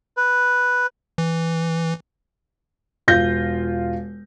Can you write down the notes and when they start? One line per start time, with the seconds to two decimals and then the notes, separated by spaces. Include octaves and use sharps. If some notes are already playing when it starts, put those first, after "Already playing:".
0.17 B4
1.18 E3
3.08 E1 F4 G6 A#6